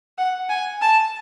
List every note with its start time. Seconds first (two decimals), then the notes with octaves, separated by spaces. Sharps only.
0.18 F#5
0.49 G#5
0.81 A5